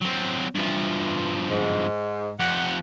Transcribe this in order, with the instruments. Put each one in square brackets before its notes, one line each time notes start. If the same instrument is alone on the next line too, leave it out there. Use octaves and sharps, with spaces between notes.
[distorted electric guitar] F#3 C4
[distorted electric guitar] G2 F3 [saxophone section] E3
[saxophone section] G#2
[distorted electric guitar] F2 G4 [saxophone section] F#5